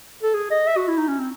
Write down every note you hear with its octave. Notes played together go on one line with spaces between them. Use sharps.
A4
G#4
D#5
E5
F#4
E4
D#4
C#4
C4